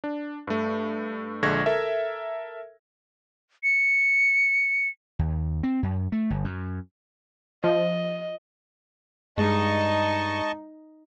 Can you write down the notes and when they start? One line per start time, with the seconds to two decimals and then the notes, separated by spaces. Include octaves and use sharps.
0.04 D4
0.47 G2 A3
1.43 A#1 D3 G#3 C#6 G#6 A#6
1.66 A4 A#4 E5
3.63 C#7
5.19 D#2
5.63 C4
5.83 F#2
6.12 A3
6.30 G1
6.44 F#2
7.64 F3 D#5
9.38 G2 G#3 D#4 D#5 A5 C#6